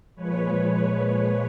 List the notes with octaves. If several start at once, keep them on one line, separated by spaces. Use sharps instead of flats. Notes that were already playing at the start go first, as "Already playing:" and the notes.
A#2 F3 G#3 B4 C#5